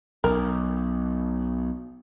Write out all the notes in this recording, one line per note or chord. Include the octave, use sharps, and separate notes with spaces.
B1 A#4